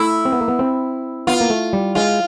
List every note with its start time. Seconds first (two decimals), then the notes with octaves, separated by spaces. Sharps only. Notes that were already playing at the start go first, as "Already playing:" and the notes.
Already playing: A3 E4
0.25 C4
0.32 B3
0.41 A#3
0.48 B3
0.59 C4
1.27 B3 F4
1.41 A#3
1.50 A3
1.73 G3
1.95 G#3 F4